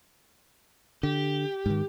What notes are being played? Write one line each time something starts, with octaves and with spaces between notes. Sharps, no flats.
D3 G4
G#2 D#3